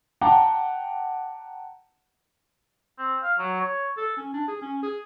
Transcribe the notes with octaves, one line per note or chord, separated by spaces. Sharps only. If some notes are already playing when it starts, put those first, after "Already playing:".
F#5 G5 A5 A#5 D6
C4
F5
F#3
C#5
A4
C#4
D4
G#4
C#4
G#4